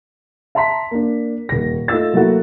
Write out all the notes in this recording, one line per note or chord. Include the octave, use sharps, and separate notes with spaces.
E5 A5 A#5 C6 B6
A#3 D4
D#1 A#6
A3 D#4 F4 E6 A6
F#3 A3 A#3 E4 F#4